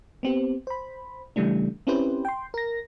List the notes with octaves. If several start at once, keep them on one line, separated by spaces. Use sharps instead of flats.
B3 C4 G4
C5 B5
C#3 E3 G3 A3 D4
C4 C#4 E4 G4 B4 C5
G5 C6
A#4 A#6